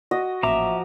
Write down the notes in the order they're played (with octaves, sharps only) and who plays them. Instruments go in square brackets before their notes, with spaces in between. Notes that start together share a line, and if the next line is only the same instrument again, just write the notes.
[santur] F#4 D#5
[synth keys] A1 A#2 [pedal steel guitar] F3 A#5 D6 [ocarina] E5